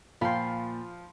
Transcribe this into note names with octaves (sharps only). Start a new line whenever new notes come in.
A#2 F3 F4 F5 G5 B5 C6